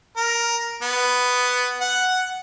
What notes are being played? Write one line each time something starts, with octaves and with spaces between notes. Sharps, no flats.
A#4
B3
F#5